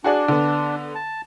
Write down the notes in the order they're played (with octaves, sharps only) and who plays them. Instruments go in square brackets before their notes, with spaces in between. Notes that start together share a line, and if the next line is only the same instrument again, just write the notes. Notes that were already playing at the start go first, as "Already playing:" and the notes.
[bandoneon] D4 [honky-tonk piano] F#4 G#4 D5
[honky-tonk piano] D3 B3
[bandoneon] A5